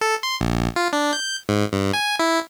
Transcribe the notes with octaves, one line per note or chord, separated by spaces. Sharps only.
A4
C6
A#1
F4
D4
G6
G#2
G2
G#5
E4